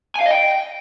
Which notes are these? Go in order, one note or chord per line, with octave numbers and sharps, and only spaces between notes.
G#5
F5
D#5
G5